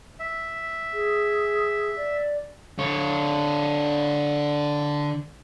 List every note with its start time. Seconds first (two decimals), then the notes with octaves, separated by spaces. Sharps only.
0.20 E5
0.93 G#4
1.96 D5
2.79 D3 C#5